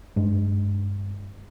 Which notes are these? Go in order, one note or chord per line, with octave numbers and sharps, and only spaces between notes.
G2 G#3